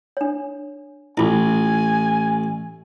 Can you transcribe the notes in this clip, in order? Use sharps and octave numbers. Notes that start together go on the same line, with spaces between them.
D4 C#5
A1 E4 F4 G#5 D6